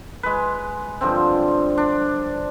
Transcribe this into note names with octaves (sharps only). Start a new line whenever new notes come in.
G#3 B4
G2 D3 F3 C4
D4